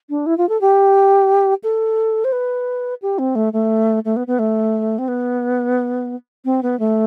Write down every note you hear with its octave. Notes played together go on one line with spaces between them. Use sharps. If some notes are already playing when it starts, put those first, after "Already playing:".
D4
E4
F4
A4
G4
A4
C5
B4
G4
C4
A3
A3
A3
B3
B3
A3
C4
B3
C4
B3
A3